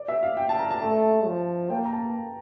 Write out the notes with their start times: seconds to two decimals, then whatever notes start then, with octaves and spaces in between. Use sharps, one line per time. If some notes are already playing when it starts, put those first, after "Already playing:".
Already playing: D5
0.08 E5
0.23 F5
0.37 G5
0.49 A5
0.59 A#5
0.71 A5
0.82 A3
1.26 F3
1.70 A#3 G5
1.85 A#5
1.93 A5